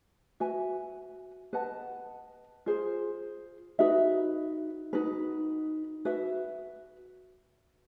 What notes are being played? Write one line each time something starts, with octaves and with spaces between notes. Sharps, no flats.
F#4 B4 E5 G#5
B4 D#5 F#5 A5
F4 G#4 C5
D#4 F#4 B4 E5
D#4 F#4 B4
F#4 B4 E5